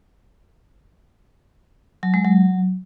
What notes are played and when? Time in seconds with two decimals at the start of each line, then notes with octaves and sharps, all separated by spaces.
2.03 F#3
2.14 G#3
2.25 F#3